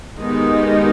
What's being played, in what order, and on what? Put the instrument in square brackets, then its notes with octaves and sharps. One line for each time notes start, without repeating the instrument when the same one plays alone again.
[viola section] D#3 G#3 B3 D#4 G4